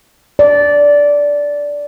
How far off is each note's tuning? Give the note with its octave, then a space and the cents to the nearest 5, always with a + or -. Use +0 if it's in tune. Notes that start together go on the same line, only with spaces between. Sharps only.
D5 -10